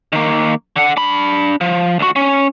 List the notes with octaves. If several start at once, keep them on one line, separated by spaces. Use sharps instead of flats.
D#3 A#3
D3 F#5
D4 B5
F3
D2 F#4
C#4